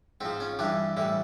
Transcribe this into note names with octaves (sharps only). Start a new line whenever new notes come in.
G#2 F3 C4
C#4
G2 E3 G3 D4
A2 E3 G3